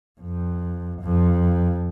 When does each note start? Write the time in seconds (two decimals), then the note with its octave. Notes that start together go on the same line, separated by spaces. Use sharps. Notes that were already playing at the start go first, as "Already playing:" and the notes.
0.21 F2
1.01 F2